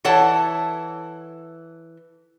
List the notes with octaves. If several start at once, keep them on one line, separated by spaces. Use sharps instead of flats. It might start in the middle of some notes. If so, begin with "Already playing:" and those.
E3 A4 C#5 F#5 A5